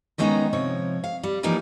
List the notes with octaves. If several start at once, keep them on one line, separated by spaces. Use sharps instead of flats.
D#3 G3 G#3 B3 C#4 D#4
C3 F3 C#5
F5
G3
E3 F3 G3 A#3 D#4